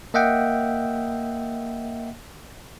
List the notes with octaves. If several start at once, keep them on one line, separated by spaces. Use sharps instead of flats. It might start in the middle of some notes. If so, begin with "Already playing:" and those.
A#3 D#5 E5 F#5 G5